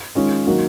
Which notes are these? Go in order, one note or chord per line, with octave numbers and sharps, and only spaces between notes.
D#3 G#3 C#4 F4
D#3 F#3 A#3 D#4 F#4